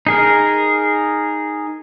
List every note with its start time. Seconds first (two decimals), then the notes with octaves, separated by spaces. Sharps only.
0.07 D#4 G#4 A#4